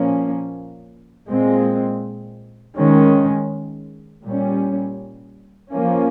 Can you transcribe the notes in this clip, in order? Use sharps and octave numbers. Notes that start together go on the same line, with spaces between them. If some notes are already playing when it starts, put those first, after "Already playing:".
Already playing: A#2 F3 A#3 C#4
A#2 G#3 C4
D#3 G#3 C#4
A#2 G3 C#4
F3 A#3 C#4